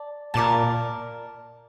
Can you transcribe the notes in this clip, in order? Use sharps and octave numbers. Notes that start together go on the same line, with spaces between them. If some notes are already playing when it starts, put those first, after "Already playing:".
Already playing: D5 A5
A#2 A#4 D5 A5